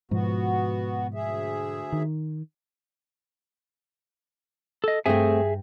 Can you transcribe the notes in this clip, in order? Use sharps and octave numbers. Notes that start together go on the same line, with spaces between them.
G#2 B2 F3 B3 F#4
D2 G#4 E5
D#3
A4 D#5
G2 A3 C4 G#4 E5 G5 G#5 A#6